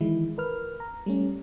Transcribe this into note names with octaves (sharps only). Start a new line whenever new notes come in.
D#3 E3 G#3 E4
A#4 B4 F6
A#5
G3 A3 C#4